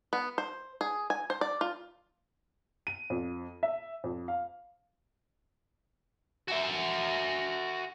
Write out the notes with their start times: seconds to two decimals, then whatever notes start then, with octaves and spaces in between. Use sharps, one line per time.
0.13 B3
0.38 C5
0.81 G#4
1.10 G#5
1.30 C5
1.41 D5
1.61 F4
2.87 D#7
3.10 F2
3.63 E5
4.04 F2
4.28 F5
6.48 F#4 E5